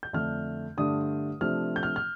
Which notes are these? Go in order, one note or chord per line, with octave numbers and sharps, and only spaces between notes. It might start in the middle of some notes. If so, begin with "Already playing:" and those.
G6
F2 D3 A3 D4 F6
G2 D3 A3 D4 D#6
C3 F3 A3 D4 F6
G6
F6
F6